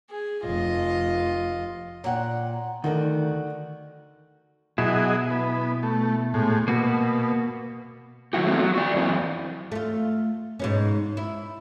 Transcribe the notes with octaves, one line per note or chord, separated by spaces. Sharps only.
G#4
F1 F4 D#5
A#2 C#5 F#5 G5
D2 D#3 F#4 A4 A#4 D5
B2 F#3 E4 G#4 D#5
B3
A3
A2 G#3
B2 A#3 F#4
D#3 F#3 E4 F#4 G4
F#3 A3 B3 C4
F#3
F#4 D5
F#2 E3 C4
A3 F4
G#2 B2 C#4
E4